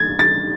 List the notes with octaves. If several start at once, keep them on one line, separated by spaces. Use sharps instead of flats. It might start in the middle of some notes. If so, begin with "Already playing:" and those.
Already playing: G#6 A6
A6